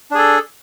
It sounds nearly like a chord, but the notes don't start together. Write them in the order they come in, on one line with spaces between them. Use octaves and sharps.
D4 G#4 A4